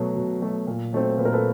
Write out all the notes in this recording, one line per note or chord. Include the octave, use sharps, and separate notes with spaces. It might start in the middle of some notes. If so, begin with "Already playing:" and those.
Already playing: B2 F#3 A3
B2
F#3 A3
A#2
F#3 A3 C4
A#2 B4
A#4
A4 B4